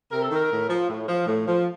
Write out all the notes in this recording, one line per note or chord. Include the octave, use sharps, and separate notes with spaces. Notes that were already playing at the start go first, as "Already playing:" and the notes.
C3 A#4
A4
D#3 A#4
A2
F3
A2
F3
A2
F3